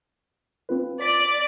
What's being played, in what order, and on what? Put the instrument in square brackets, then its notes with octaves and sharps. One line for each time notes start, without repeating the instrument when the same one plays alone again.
[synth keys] C4 F4 B4
[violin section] D5 [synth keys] B6